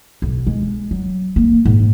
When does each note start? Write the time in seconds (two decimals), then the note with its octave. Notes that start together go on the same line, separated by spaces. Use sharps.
0.22 B1
0.47 G#3
0.91 F#3
1.36 A#3
1.66 G#2